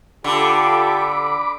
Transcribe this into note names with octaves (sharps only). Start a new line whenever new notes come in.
D3 F4 G4 A4 B5 D6